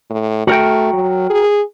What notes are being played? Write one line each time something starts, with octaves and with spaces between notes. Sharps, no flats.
A2
A3 F#4 A#4 G5
F#3
G#4